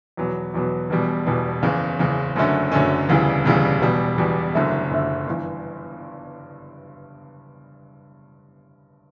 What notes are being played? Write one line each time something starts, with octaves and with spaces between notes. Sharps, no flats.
E2 B2 F#3 B3
E2 B2 F#3 B3
E1 E2 B2 G3
E1 E2 B2 G3
F#1 E2 C#3
F#1 E2 C#3
F#1 F#2 D3 A3 C#4
F#1 F#2 D3 A3 C#4
E1 D2 C#3 E3 G3
E1 D2 C#3 E3 G3
E1 E2 B2 G3
E1 E2 B2 G3
F#1 F#2 D3 A3 E4
F#1 F#2 D3 A3 E4
G1 G2 E3